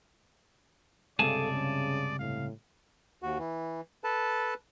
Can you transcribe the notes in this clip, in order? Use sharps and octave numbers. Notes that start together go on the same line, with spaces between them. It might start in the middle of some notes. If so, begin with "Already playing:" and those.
C#2 G2 C3 G#4 A4 D5 G#5 A5
C#3
A2 F5
D#2 F#4
E3
A4 B4 A5